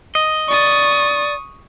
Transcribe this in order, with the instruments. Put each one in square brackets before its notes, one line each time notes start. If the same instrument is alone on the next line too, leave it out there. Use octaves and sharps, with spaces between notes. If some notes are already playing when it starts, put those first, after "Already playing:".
[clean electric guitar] D#5
[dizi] D5 [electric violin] C#6 D#6